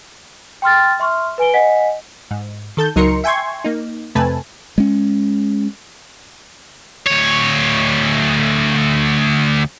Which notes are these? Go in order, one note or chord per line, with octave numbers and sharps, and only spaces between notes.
G5 C6 F6 A6
E5 C6 C#6 F6
B4 G#5 D7 G7
D#5 F#5 G#5 B6
G#2
D#3 A4 A5 G6
C#2 F#3 D#4 A#4 C6 C#7
E5 G5 G#5 C6 C#6 G#6
A#3 D#4
F2 C3 A3 B4 G#5 A5
G#3 C#4
D2 C#5